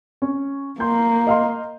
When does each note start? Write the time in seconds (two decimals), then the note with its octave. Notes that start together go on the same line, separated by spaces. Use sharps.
0.22 C#4
0.80 A#3 C6 G6
1.27 D#5 F5 C6